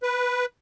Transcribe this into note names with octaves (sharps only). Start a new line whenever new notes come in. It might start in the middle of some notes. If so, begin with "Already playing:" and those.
B4